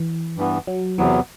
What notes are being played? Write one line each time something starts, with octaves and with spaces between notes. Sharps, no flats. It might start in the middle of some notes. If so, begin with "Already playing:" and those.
Already playing: E3
G2 E3 B3
F#3
E2 C3 E3 F#3 B3